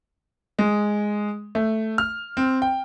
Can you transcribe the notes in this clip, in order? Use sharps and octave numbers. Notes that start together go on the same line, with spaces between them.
G#3
A3
F6
C4
G5